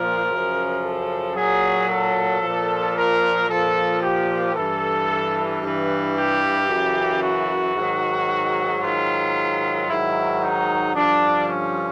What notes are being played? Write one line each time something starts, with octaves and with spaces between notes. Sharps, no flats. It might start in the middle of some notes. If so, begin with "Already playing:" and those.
Already playing: A#2 F3 A#4
F#2 C#3 F3
A4
A#2 F#3 G#4
A4
A#2 F3
A#4
A#2 F3 A4
G4
G2 E3 A4
G2 E3
G4
F#2 C#3 E3
F#4
G#2 D#3 F#3
G#2 D#3 F#3 F4
G#2 D#3 F#3 E4
D#4
G2 D3 F3 D4
C#4